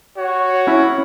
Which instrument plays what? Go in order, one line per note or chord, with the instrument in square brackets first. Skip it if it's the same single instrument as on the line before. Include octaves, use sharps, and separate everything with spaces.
[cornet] F#4 [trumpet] C#5
[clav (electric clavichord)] C#4 E4